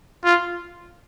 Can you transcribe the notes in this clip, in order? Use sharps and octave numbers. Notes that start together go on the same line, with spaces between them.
F4